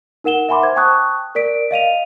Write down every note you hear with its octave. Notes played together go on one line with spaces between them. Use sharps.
D#4 A#4 F#5 E7 G7
E5 F#5 G#5 B5 C6 D6
C5 G#6
G5 A5 C#6 D#6 F#6
A#4 D5 B6 D7
D#5 F5 D#7 F7